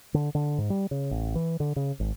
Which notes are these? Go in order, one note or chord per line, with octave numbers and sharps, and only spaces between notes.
D3
D3
G#2
G3
C#3
A1
E3
D3
C#3
G#1